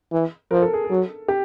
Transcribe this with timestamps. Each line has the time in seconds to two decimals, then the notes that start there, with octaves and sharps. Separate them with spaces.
0.12 E3
0.51 F3 A#4
0.62 A4
0.73 G#4
0.85 A4
0.90 F#3
1.28 G4